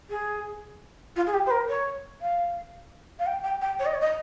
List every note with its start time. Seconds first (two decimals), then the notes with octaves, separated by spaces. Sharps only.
0.10 G#4
1.16 F4
1.27 G#4
1.34 G4
1.46 C5
1.50 A#4
1.69 C#5
2.21 F5
3.19 F5
3.26 G5
3.43 G5
3.61 G5
3.79 C#5
3.86 D#5
3.94 C#5
4.00 D#5